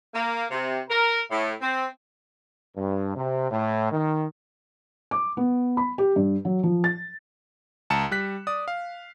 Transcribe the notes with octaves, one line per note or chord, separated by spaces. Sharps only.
A#3
C3
A#4
A2
C4
G2
C3
A2
D#3
D6
B3
B5
G4
G2
F#3
F3
A6
C#2 A5 A#5 C#7 E7
G3 F#6 B6
D5 D#6
F5